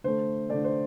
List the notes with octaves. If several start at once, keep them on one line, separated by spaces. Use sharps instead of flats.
D3 A3 C5
D3 A3 D5
C5